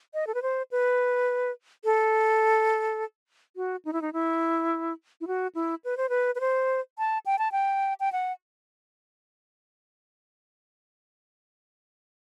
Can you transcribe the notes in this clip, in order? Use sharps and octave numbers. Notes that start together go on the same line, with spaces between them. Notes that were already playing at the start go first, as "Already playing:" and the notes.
D#5
A4
B4
C5
B4
A4
F#4
D#4
E4
D#4
E4
E4
F#4
E4
B4
C5
B4
B4
C5
A5
G5
A5
G5
G5
F#5